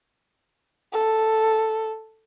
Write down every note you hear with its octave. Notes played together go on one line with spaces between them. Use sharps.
A4